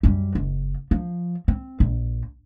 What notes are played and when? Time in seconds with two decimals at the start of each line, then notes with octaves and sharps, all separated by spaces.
0.03 F#2 G3
0.35 F#1
0.91 F3
1.48 C4
1.80 A#1